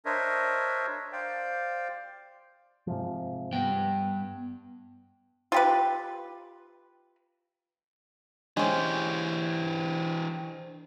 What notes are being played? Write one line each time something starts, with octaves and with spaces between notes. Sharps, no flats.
D4 A#4 C5 C#5 D#5 E5
C5 D5 F5 G5
G#2 C3 F3
G2 B3 G5
F4 G4 B4
E3 G#3 C#4 D4 G4 C5